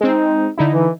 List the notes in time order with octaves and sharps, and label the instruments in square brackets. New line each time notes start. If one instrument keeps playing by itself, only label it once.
[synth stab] G#3 C4 [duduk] D#4
[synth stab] D3 D#4 E4
[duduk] E3